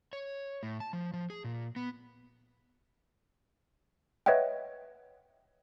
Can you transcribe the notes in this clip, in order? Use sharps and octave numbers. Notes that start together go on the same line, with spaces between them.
C#5
A2
A5
F3
F3
G#4
A#2
B3
B4 C#5 D#5 E5 F#5 G5